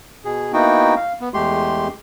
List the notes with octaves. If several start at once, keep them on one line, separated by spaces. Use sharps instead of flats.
B2 G#4
A#3 B3 D#4 E4 F#4 G5
F5
B3
E2 G#3 A3 G4 C6